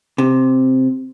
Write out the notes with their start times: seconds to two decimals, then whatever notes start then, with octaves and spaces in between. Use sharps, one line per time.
0.18 C3